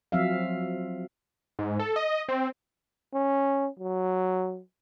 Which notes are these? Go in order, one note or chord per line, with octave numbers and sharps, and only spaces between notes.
F3 F#3 C4 E5 F5
G#2
A4
D#5
C4
C#4
F#3